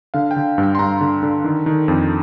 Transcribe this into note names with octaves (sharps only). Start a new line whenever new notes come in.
D3 F5
G5
D3
G2
G5
C6
G2 A#5
D3
D3
D#3
D#3
F2